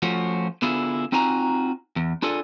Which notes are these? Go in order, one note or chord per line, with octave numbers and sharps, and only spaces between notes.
F3 A3 C#4 F4 F#4
D3 B3 E4 F4 G#4
C4 D#4 F4 F#4 G#5 A#5
E2
D4 F4 G#4 A4 D5